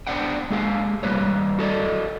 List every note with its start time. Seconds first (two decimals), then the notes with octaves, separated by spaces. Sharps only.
0.07 B3 D4 C5 D5 F#5 G5
0.50 G#3 A#3 G#4 F5
1.03 G3 A#3 B4 C#5
1.59 F#4 A4 D5 D#5